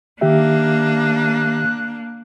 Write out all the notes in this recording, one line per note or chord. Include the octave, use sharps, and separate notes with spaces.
D#3 A#3 D4 G4 E5 F#6